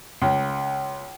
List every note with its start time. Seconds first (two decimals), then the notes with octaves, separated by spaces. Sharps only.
0.22 C#2